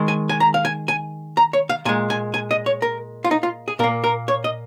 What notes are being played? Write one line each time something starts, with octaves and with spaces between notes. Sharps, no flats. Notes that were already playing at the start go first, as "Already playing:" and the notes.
Already playing: D#3 G#3
G#5
G#5
A#5
F5
G#5
G#5
A#5
C#5
F5
A#2 G#3 G#5
G#5
G#5
D#5
C#5
A#4
F4
D#4
F4
G#4
A#2 A#3 A#4
A#4
C#5
D#5